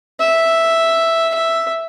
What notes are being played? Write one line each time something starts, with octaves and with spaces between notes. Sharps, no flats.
E5
E5